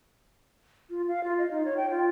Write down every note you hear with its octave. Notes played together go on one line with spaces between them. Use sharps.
F4
F5
F4
D#5
D#4
C#5
G5
F4